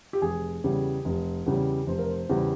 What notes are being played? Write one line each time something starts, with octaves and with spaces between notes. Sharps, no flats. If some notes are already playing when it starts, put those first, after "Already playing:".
G4
F1 G#4
E2 C#3 G3
F1
E2 C#3 G3
F1 C5
A#4
C5
E2 C#3 G3